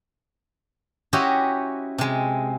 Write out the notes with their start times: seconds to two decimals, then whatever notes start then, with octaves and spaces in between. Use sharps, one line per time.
1.13 C#4 E4 F#4 G4 C5 D#5
1.98 C3 G#3